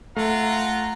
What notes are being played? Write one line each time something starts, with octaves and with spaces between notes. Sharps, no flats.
A3 F4 F#5 A#5